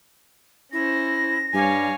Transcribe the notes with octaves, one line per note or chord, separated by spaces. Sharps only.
C#4 E4 C5 A#6
G2 G3 C#5 F5 G#5